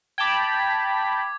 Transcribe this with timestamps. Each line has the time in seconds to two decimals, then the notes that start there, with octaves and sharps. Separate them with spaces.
0.18 G5 A5 B5 D6 G#6